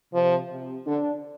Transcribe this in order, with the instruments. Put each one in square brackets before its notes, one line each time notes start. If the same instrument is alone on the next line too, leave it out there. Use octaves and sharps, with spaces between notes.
[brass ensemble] C3 [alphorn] F3
[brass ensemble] C3
[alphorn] D3 [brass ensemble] D4